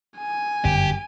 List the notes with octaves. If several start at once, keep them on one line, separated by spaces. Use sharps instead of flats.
G#5
G1 F#2 G4